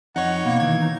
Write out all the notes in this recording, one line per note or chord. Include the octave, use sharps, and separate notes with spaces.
F2 D#4 C#5 F#5
B2 A#3
D#3 E3 G#6
D#4